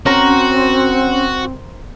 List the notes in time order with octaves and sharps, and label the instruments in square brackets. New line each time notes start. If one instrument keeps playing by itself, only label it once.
[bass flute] C4 [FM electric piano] C#4 [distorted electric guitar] F#4 [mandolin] A#4 C5 A#5